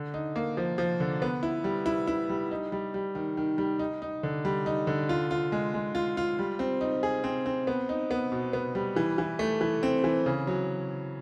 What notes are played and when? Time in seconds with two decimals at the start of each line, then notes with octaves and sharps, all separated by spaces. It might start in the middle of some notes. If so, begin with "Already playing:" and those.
Already playing: D3
0.14 D#4
0.36 A#3
0.57 F3
0.78 F3
1.00 D3
1.22 B3
1.43 E4
1.64 G3
1.86 E4
2.07 E4
2.29 G3
2.51 D#4
2.72 G3
2.94 G3
3.15 D#3
3.37 D#3
3.58 G3
3.79 D#4
4.02 D#4
4.23 D3
4.45 G3
4.66 D#4
4.87 D3
5.09 F4
5.31 F4
5.52 G#3
5.74 G#3
5.95 F4
6.17 F4
6.39 G3
6.59 C4
6.81 D#4
7.03 G#4
7.24 C4
7.46 C4
7.67 B3
7.89 D#4
8.11 B3
8.32 B2
8.53 B3
8.75 G3
8.96 E3
9.18 E3
9.39 A3
9.61 E3
9.83 C4
10.04 E3
10.26 C#3
10.47 F#3